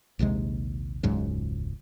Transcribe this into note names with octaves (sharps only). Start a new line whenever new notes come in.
A#1 D#2 C3 G#3
E1 C#2 G#2 F#3